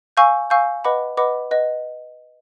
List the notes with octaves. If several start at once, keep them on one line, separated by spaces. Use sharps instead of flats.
F5 G#5 C#6 E6 G6
F5 G#5 C#6 E6 G6
B4 D#5 F#5 B5 D6
B4 D#5 F#5 B5 D6
B4 D#5 F#5